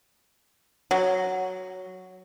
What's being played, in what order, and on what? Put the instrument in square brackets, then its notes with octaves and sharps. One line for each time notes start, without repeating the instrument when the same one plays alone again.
[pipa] F#3